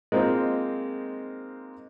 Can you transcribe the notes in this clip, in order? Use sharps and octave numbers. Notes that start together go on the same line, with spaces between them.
G#3 A#3 C4 D#4 F4 C5